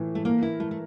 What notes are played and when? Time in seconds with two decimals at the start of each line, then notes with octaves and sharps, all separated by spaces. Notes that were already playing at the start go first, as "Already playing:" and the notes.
Already playing: A2 E3
0.15 A3
0.25 A#3 A#4
0.43 E4
0.60 A3 E4
0.71 A3